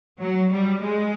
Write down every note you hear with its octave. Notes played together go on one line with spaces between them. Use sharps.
F#3
G3
G#3